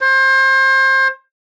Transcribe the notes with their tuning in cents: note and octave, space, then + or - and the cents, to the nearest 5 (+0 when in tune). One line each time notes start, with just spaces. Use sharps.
C5 +30